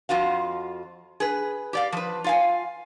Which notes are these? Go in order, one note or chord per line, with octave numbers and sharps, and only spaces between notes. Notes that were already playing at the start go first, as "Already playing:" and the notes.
F2 F4 F#4 F5
G#4 B4
G4 D5 F5
F3 B4
F4 F5 G#5